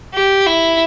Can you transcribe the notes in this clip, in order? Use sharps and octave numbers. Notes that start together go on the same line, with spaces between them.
G4
E4